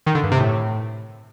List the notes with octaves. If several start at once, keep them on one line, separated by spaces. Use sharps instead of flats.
D#3
D3
G2
C3
A2